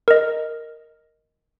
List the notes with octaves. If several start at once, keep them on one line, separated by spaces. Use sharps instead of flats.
A#4 D#5